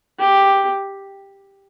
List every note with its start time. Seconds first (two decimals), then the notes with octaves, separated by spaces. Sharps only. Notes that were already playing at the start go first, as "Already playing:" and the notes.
0.19 G4